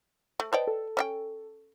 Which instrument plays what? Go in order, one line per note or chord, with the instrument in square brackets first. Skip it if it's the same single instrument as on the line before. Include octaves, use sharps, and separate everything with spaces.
[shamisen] A3
[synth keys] B4 D#5 A5 [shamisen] C5 D5 G5
[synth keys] A4
[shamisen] C#4 E5 G5